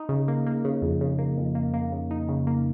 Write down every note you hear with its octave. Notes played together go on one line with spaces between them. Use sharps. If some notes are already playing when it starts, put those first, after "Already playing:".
Already playing: D#4
C#3
A#3
A#3
C#3
F2
C#3
A#3
F2
A#3
A#3
C#3
D#4
C#3
A#3